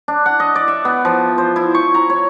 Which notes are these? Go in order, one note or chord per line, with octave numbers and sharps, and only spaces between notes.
D4
F#5
D#5
D5
E5
B3
F3
C5
E4
C#6
A#5
C#5